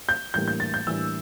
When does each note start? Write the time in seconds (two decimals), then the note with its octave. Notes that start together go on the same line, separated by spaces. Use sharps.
0.09 G6
0.34 A2 E3 G3 A#3 D4 G6
0.48 G6
0.60 A6
0.74 G6
0.86 A2 E3 G3 A#3 D4 E6